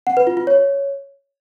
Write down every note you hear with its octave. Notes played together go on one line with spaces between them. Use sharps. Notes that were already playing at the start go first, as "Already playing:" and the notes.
F#5
B4
F4
F4
C#5